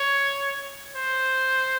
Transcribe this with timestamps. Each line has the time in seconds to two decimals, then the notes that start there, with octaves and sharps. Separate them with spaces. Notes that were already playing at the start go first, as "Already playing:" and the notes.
Already playing: C#5
0.96 C5